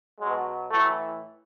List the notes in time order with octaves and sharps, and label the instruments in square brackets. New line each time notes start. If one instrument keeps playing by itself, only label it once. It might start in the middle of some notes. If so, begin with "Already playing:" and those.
[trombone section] B2 F#3 G#3
A2 E3 F#3 A3